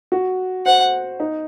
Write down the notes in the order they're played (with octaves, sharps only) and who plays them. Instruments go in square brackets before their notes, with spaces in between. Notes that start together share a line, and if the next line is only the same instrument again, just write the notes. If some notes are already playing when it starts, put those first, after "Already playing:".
[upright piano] F#4
[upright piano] C5 [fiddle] F#5
[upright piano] D#4